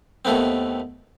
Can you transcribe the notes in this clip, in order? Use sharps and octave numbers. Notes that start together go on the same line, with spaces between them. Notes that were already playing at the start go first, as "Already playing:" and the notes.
D#2 D#3 A3 B3 C4